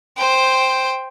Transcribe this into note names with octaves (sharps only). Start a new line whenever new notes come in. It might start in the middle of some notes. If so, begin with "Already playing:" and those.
C5 G5